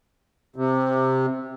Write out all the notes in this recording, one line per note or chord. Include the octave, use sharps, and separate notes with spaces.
C3